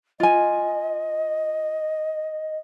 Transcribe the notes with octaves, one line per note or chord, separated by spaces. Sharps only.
F4 D#5 G#5